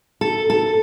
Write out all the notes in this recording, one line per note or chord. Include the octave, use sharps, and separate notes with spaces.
A4
A4